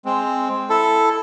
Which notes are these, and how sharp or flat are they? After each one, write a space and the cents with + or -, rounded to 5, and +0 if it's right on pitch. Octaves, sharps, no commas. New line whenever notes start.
G#3 +0 C4 +0
E4 +0 A4 +0